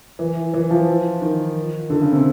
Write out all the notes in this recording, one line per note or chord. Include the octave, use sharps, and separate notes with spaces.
E3
E3
F3
D#3
D3
C#3
C3